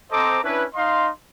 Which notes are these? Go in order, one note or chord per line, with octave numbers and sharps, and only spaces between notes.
C4 A4 C5 D#5 A#5 D6
C#4 D4 E4 B4
D#4 D#5 F5 C6